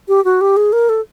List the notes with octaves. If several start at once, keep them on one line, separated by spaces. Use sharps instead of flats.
G4
F#4
G4
G#4
A#4
A4